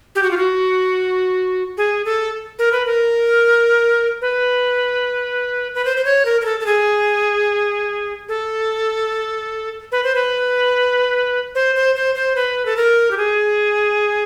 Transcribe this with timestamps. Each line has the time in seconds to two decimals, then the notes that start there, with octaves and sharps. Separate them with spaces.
0.15 G4
0.23 F#4
0.31 F4
0.37 F#4
1.77 G#4
2.05 A4
2.59 A#4
2.72 B4
2.86 A#4
4.21 B4
5.75 B4
5.85 C5
5.97 C5
6.05 C#5
6.25 A#4
6.41 A#4
6.45 A4
6.60 A4
6.66 G#4
8.29 A4
9.92 B4
10.03 C5
10.15 B4
11.55 C5
11.75 C5
11.95 C5
12.15 C5
12.36 B4
12.66 A4
12.77 A#4
13.11 G4
13.17 G#4